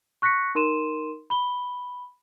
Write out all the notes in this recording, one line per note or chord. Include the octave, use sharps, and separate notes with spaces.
C#6 F#6 A#6 B6 C#7
D#4 A#4 C6 D#7 E7
B5 G7